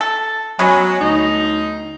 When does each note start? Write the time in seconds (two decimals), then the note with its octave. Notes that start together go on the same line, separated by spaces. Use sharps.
0.01 A4
0.59 F#3 G#3 B3 C#4
1.00 D2 D#4